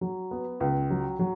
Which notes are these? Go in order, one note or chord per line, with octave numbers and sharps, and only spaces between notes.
F#3
B3
C#2
F#3
F#3